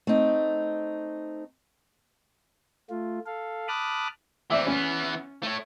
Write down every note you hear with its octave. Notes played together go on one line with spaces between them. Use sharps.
A3 C4 D#4
A3 F4
A4 F5
A5 B5 D6 D#6 F6 F#6
E3 C4 D5 E5
E3 B3 C#4
A3 C#5